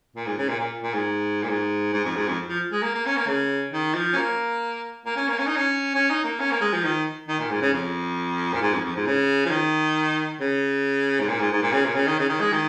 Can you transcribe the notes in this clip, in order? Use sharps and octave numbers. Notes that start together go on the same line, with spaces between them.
A#2
G#2
C#3
A#2
A#2
A#2
G#2
A#2
G#2
G#2
F2
G#2
F2
F3
G#3
A#3
A#3
C#4
A#3
C#3
D#3
F3
C#4
A#3
A#3
C#4
A#3
C#4
D#4
C#4
C#4
D#4
A#3
C#4
A#3
G#3
F3
D#3
D#3
A#2
G#2
C#3
F2
A#2
G#2
F2
F2
G#2
C#3
F3
D#3
C#3
G#2
A#2
G#2
G#2
A#2
C#3
A#2
C#3
D#3
C#3
D#3
G#3
D#3